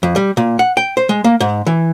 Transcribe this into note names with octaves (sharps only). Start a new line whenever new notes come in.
F2
G3
A#2
F#5
G5
C5
G#3
A#3
G#2
E3